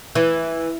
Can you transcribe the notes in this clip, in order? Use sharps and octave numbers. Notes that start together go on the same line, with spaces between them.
E3